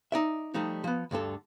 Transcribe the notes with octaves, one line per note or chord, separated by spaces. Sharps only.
D#4 D5 E5
F3 G3 A3 D#4
F3 B3
D2 G2 D3 A4